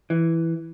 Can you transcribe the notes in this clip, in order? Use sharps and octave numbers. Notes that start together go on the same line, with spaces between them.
E3